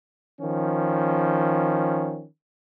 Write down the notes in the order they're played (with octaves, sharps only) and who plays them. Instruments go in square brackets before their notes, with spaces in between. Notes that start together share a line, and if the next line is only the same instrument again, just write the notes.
[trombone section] D#3 F3 C#4